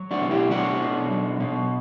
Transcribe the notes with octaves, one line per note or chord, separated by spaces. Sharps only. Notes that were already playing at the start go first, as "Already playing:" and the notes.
Already playing: F#3
D4 F#4
B2
E4 G4
F#3 D4 F#4
B2
F#3
B2